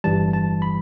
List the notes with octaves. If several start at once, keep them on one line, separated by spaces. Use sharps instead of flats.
G1 G2 E3 G3 A5
A5
B5